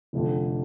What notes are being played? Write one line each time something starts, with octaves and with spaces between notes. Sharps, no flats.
F1 F2 D3